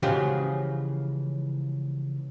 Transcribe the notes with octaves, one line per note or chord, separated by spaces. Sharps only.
C#3 E3 F3 G#3 F#4 G4